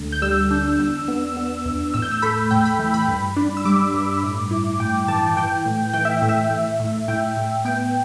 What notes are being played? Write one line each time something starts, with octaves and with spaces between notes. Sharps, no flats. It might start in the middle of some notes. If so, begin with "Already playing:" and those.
Already playing: D2 D3
G6
G3 E6
D4
E2
B3
B3
E2
A2 E6
G6
E6
A3 B5
A2 G5
B5
E3
B5
G2
D4
E6
G3 D6
G2
A2
E4
A2 G5
E3 A5
E3 G5
A2
E3 G5
E5
A2
E5
A2
A2
A2 G5
A2
B3 G5